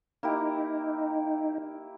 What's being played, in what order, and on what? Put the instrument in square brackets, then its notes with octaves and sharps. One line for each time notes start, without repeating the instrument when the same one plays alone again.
[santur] A#3 E4 G4 [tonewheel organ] D#4